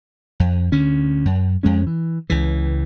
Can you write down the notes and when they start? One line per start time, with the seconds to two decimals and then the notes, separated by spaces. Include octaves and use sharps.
0.40 F2
0.72 D2 D3 C#4
1.25 F#2
1.63 F2 G#3 C#4
1.87 E3
2.30 C#2 C#3 E3